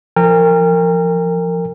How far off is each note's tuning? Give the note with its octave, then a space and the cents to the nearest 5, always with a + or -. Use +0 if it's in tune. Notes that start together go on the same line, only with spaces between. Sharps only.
F3 -15 A#4 -25 G5 +40